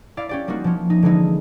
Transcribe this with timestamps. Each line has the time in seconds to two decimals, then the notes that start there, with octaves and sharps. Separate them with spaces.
0.17 E4 D5 F5
0.29 C#4 G4 D5
0.48 G3 A#3 C4 D#4 F#4
0.64 F3 C#4
0.90 D#4
1.02 D3 E3 G#3 D#4